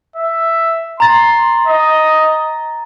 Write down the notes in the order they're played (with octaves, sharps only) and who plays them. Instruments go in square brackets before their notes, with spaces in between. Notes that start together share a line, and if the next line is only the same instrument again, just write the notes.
[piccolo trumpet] E5
[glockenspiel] A#5 A6 [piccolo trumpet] C6
[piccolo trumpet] D#5